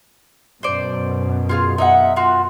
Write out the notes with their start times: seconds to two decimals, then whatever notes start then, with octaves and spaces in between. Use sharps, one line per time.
0.63 F#2 B2 C5 D5
1.49 F4 G#4 F5
1.78 D#4 E5 F#5
2.16 F4 F#4